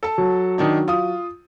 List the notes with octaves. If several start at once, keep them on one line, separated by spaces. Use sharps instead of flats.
A4 A5
F#3
D#3 D4 D#4
F4 D#6